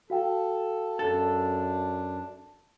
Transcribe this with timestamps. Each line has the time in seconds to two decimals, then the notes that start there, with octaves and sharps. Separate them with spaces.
0.10 F#4 A4 F5 G5
0.99 F#2 D4 A4